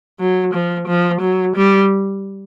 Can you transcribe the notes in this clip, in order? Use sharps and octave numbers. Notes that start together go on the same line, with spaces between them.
F#3
F3
F3
F#3
G3